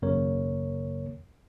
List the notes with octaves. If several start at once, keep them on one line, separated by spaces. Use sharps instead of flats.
G#1 F#2 C#3 A#3 A#4 C#5